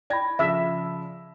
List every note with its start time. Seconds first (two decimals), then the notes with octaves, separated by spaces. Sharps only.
0.10 D5 G5 B5 G#6 A#6
0.39 C#3 F3 E5 E6